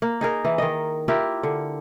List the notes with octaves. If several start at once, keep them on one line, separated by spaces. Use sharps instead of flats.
A#3
D#4 G#4 A#4
E3
D#3 D#5
E4 F4 G4 A#4
D3